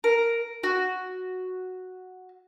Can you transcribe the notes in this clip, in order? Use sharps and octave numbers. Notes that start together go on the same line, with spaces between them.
A#4
F#4